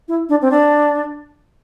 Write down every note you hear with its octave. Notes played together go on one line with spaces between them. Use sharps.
E4
D4
C4
D4